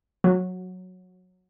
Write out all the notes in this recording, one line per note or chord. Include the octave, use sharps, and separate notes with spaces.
F#3